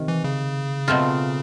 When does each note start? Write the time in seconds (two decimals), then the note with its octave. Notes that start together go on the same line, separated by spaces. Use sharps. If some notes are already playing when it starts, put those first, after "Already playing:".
Already playing: C3 D#3
0.08 E3
0.24 C#3
0.88 B2 F#3 A3 C4 F4